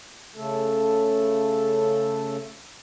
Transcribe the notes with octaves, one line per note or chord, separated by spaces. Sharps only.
C#3 A3 A4